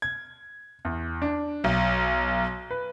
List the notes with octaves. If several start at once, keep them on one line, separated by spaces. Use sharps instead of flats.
G#6
E2
D4
B1
B4